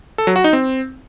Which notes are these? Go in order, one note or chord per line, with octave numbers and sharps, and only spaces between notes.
A4
F#3
F#4
D#4
C4